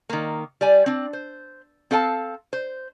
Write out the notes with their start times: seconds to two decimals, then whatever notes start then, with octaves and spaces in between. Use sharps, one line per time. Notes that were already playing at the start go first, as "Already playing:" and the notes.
0.09 D#3 A#3
0.61 G3 D5 G#5
0.86 C4 D4
1.13 C5
1.91 C4 A4 F5 G5 A5
2.53 C5